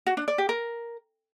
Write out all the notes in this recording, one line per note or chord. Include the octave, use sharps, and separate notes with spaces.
F#4
D4
D5
G4
A#4